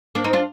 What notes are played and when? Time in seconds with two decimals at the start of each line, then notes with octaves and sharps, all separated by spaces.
0.15 A#3 D4
0.24 C4 D#4
0.33 D4 F4